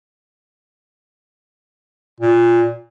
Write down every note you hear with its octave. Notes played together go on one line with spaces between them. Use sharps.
A#2